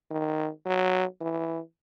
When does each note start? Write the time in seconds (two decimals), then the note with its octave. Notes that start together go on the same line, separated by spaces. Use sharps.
0.10 D#3
0.66 F#3
1.21 E3